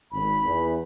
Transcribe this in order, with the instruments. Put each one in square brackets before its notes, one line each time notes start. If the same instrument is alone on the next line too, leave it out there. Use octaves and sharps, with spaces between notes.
[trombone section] G#1 [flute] B5
[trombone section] E2